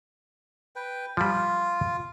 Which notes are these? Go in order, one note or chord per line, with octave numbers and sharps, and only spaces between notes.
B4 G5
F3 G3 F4